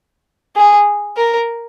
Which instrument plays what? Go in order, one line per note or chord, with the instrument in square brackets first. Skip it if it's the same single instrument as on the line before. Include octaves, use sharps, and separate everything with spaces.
[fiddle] G#4
A#4